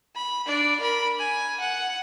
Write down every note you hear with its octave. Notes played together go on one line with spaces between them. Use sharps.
B5
D4 D5
A#4 B5
G#5
F#5